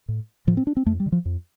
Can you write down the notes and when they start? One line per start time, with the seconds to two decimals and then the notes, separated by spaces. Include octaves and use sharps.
0.08 A2
0.47 A2 F3
0.57 C4
0.67 D4
0.77 C4
0.86 F2 A3
1.00 G3
1.06 D3
1.12 F3
1.25 F2